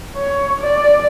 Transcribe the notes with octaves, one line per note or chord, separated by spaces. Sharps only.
C#5
D5